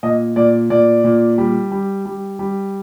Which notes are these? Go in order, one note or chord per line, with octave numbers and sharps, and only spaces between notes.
A#2 D#5
A#2 D5
A#2 D5
A#2
G3
G3
G3
G3